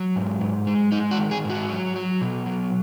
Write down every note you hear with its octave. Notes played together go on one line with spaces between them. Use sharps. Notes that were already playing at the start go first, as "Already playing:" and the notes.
Already playing: F#3
G#2
G#2
G#3
G#3 D#4
F#4
D#3
G#4
G#2
F#4
F#3
F#3
B2
F#3